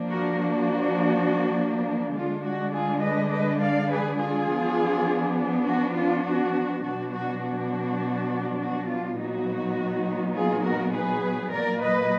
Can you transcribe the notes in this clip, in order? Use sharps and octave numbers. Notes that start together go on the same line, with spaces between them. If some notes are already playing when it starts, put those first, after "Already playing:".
Already playing: F3 A#3 D4
F#4 A#4
F#4
D3 G#3 D4 F4
F#4
F4 G#4
B4 D#5
B4 D#5
D5 F5
G#4 B4
F4 G#4
F3 B3 D4
F#4
F4
F#4
B2 F#3 D4 F#4
F#4
F#4
F#4
F4
A#2 F#3 B3 D#4 F#4
F4 G#4
F#4 A#4
G#4 B4
A#2 F#3 A#3 A#4 D5
B4 D#5